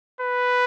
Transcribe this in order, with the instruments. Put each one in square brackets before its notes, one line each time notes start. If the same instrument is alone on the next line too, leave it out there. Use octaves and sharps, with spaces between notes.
[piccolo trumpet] B4